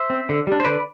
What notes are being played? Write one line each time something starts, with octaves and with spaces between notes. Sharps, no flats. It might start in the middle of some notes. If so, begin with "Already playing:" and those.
Already playing: C5 E5
C4
D3
G3 D4
C5
D3 B4 D5